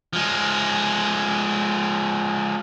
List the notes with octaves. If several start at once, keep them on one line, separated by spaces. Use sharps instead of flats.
F3 G#3